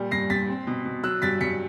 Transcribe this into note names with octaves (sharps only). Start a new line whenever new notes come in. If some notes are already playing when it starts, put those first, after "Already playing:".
Already playing: A#2 G3
G2 A#6 C7
G2 A6 B6
C4
B2
B2
F#3 E6 F#6
G2 A6 B6
G2 B6 C#7